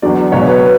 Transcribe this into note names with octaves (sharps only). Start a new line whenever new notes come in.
E2 D3 F#3 D5
C#2 B2 F#3 C#5
B4
B4